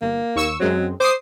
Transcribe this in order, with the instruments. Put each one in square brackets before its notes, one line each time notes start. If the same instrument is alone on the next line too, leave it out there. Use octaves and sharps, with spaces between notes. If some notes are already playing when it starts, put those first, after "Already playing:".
[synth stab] G1 [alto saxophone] A#3
[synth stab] D#2 C#6 E6
[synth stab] F#2 G#3 C4 [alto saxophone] F#3
[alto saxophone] C5 [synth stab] D6 D#6 C7